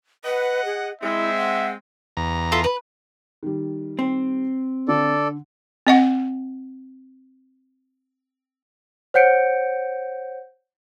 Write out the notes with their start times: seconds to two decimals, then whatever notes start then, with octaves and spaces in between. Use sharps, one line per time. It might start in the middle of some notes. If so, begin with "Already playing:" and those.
0.25 B4 D#5 F#5
0.65 G#4
1.01 G#3 C4 E4 E5
1.37 F#5
2.17 E2 A#5
2.52 F4 A4 E5
2.64 B4
3.43 D#3 G3
3.99 C4
4.88 D3 A4 D5
5.87 C4 D#5 F#5
9.14 C5 C#5 F#5 G6 C#7 D7